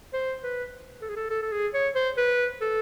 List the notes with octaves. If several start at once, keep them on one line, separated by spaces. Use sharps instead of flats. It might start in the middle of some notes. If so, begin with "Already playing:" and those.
C5
B4
A4
G#4
A4
A4
A4
G#4
C#5
C5
B4
A4